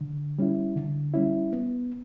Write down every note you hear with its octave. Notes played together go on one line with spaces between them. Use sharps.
D3
G3 C#4 E4
D3
G3 C#4 E4
B3